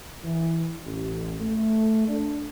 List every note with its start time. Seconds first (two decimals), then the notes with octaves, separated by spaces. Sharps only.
0.23 E3
0.85 A1
1.40 A3
2.07 D4